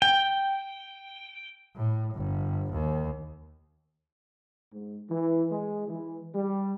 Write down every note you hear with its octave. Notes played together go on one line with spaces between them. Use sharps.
G5
A2
G1
D#2
G#2
E3
G#3
E3
G3